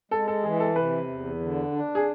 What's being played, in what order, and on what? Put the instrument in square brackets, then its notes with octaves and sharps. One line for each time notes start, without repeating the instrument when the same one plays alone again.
[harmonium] G#3 [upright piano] A4
[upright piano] A4
[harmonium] E3 [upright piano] G#4
[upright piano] A4
[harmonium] C3 [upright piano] B4
[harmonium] E2
D3
D4
[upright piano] G#4